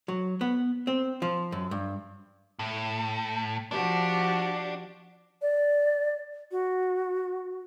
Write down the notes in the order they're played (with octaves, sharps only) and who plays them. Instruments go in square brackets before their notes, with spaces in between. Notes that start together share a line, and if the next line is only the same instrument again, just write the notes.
[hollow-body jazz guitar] F#3
B3
C4
F3
F#2
G2
[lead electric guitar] A2
[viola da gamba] F3 F#4 G4 [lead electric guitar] D4
[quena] D5
F#4